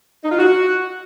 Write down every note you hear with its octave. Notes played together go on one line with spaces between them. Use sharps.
D#4
F4
F#4